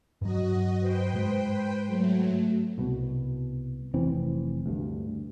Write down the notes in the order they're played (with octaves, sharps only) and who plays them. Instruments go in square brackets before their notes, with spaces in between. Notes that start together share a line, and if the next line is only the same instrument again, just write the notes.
[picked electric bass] G2 F#3 [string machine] F#4 D#5
[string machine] B4 C5 G5
[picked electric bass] G#2 G#3
[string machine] F#3 A3
[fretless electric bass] C2 B2
F1 E3 C4
D2 G2